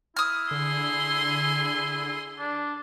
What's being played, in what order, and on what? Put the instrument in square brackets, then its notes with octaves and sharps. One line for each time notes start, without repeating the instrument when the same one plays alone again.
[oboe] E4 [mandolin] D#6 F6
[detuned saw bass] D3 [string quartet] G#4 C6
[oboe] D4